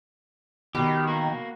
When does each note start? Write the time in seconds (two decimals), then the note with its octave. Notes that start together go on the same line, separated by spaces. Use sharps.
0.75 B2 D#3 G4
1.07 A#3 F#4